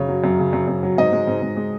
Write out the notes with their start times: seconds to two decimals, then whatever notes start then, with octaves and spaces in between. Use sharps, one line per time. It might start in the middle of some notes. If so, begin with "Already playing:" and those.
Already playing: F#2 C#3 C#5
0.09 F#3
0.24 F#2
0.38 C#3
0.53 F#2
0.68 F#2
0.83 F#3
0.98 G#2 D#5
1.12 G#3
1.27 G#2
1.42 G#2
1.57 G#3